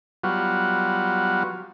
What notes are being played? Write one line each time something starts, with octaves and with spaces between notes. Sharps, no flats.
F#3 G3 B3 F4 F#4